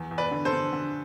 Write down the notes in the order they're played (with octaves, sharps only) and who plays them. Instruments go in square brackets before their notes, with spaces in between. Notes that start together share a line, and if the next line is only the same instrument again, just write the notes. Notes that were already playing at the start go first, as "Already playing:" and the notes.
Already playing: [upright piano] E2
E2
B4 D5
D3
A4 C5
D3
D3